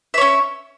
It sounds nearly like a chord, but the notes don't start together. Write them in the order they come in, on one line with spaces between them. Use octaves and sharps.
E5 C#5 C#4